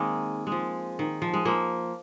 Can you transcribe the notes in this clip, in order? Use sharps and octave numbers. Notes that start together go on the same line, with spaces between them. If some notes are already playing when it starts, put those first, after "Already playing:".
Already playing: D#3 G#3 A#3 C4
G#3
F3
D#3
F3
G#3
F3 A#3